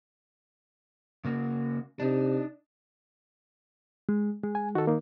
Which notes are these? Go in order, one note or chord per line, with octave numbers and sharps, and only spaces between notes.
C#3 A#3 F#4
C3 D4 D#4
G#3
G#3
G#5
D#3 F#4 A4
A#3 D#4